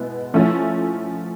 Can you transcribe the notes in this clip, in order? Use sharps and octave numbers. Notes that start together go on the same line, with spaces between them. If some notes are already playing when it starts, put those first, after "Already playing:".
Already playing: B2 G#3 B3 E4
F3 A3 C#4 E4